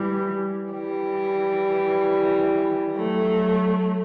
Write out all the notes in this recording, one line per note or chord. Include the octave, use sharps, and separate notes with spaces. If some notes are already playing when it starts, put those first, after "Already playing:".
Already playing: E3 G3
E3 G3
F#3 A3